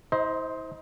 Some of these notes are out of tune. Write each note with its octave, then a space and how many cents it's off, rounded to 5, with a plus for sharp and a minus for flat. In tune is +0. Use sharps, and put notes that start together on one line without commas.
E4 -45 C5 +0 D#5 +20